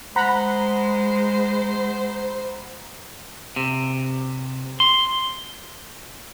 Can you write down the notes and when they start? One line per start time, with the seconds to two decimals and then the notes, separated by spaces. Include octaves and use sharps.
0.16 G#3 C5 F#5 A#5 B5
3.56 C3
4.80 C6